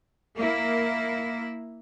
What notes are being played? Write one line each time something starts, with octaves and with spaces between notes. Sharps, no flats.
A#3 E4